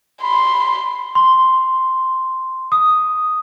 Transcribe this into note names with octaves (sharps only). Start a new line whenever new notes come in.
B5 C6
C6
D#6